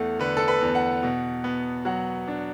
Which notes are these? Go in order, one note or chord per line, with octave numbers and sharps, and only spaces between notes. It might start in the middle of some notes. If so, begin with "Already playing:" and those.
Already playing: E2 A3 F#5
D3 B4
A4
B4
E2
F#5
B2
B3
F#3 F#5
D4